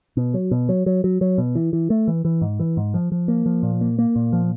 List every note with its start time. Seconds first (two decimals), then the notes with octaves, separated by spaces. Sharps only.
0.17 B2
0.34 F#3
0.51 B2
0.69 F#3
0.86 F#3
1.04 F#3
1.21 F#3
1.38 B2
1.55 E3
1.73 E3
1.90 A3
2.08 E3
2.25 E3
2.41 G#2
2.60 E3
2.77 G#2
2.94 F3
3.12 F3
3.28 A#3
3.46 F3
3.63 A#2
3.81 A#3
3.99 A#3
4.16 A#2
4.33 F3